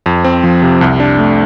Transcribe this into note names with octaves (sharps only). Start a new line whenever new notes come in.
F2
C4
F3
C3
C2
D4
A3